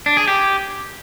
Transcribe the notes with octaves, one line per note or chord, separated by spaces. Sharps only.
D4
G#4
G4